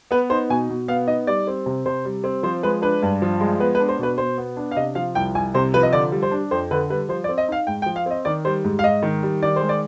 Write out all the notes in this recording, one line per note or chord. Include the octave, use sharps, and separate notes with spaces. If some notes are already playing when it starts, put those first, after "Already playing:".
B3 B4
D#4 C5
B2 G#5
B2
B3 F5
D#4 D#5
G3 D5
C4
C3
C3 C5
G3
C4
F3 C5
G#3 B4
D4 B4
G2
F3
G#3
B3 B4
B4
D4
C5
B2 B4
B2 C5
B3
D4
F5
C3 D#5
F3 F5
C2 G5
C2 G#5
C3 C5
F3 B4
D#5
D3 D5
G3
C5
D4
F2 C5
D3 B4
G3 B4
F3 C5
D5
C4
D#5
D#4 F5
G#2 G5
G5
F3
F5
C4 D#5
D#3 D5
G3 C5
G#2
F5
G#2 D#5
D#3
G3
D#3 D5
G#3 C5
D5